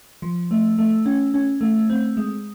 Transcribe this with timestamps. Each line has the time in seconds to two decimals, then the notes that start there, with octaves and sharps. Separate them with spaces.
0.22 F3
0.51 A3
0.79 A3
1.06 C#4
1.34 C#4
1.61 A3
1.90 C4
2.17 G#3